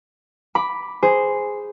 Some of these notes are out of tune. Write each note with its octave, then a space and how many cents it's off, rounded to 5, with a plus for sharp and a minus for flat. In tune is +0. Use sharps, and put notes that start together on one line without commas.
B5 +0 D6 +0
G#4 +0 C5 -10